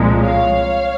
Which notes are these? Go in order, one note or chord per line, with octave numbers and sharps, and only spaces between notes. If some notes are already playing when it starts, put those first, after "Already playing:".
Already playing: C2 A#2 F3 G#3
C#5 F5